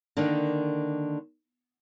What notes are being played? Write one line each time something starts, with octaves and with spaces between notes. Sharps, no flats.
D3 D#3 A#3 D4